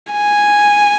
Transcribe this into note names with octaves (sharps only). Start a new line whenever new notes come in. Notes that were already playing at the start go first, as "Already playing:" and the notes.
G#5